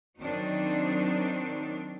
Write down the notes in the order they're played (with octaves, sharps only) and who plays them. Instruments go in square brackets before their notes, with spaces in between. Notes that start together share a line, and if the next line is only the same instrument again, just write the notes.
[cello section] D#3 F#3 C4 D4 D#4